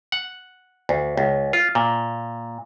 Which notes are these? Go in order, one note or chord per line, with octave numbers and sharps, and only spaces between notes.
F#5
D2
C#2
F4
A#2